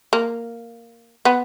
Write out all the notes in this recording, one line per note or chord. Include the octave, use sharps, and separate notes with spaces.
A#3
B3